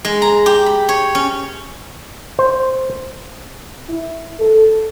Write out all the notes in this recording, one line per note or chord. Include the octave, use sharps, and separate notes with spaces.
G#3
A#5
G4
B5
C#5
C#4
C5
E4
A4